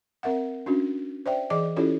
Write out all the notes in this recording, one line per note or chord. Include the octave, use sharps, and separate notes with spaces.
C4 A#4 E5 F#5
C#4 D4 F#4
C5 D5 E5 G5
E3 G#4 D5 D#5 D6
C#4 E4 F4 G4 A4 C#5